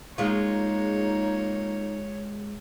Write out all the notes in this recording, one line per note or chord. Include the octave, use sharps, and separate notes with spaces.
G#3 A#3 D#4 F4 C#5